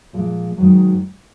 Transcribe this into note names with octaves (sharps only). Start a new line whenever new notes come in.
A#2 F3 G#3
G#2 D#3 F#3